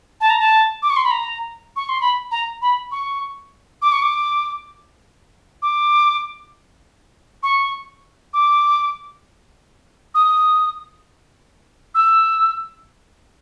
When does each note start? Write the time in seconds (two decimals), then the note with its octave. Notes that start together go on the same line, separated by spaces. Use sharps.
0.21 A5
0.30 A#5
0.39 A5
0.82 D6
0.90 C#6
0.97 C6
1.04 B5
1.11 A#5
1.76 C#6
1.89 C6
2.01 B5
2.31 A#5
2.62 B5
2.92 C#6
3.82 D6
3.92 C#6
4.02 D6
5.62 D6
7.43 C#6
8.34 D6
10.15 D#6
11.95 E6